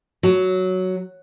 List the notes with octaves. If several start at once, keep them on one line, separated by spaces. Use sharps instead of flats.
F#3